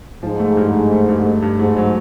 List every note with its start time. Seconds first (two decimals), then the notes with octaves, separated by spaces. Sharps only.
0.23 G#2 F3
0.40 A3
0.57 G2
0.74 A3
0.91 A3
1.09 G2
1.25 A3
1.42 G2
1.59 G#2 A3
1.77 F#3